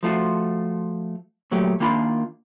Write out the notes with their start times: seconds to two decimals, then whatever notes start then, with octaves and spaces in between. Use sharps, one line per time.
0.03 F3 A3 F4 F#4
1.51 A#2 F#3 A3 G4
1.80 D#3 A#3 D4 F4 B5